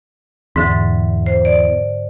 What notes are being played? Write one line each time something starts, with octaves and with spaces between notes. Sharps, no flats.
E2 G#2 D3 A6
C5
D5